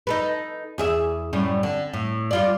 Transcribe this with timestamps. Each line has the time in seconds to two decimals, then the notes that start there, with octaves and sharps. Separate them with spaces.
0.07 D#4 A4 B4
0.78 E2 G#4 E5
1.33 F#2 A2 G3
1.63 D3
1.93 A2
2.31 G3 F4 D5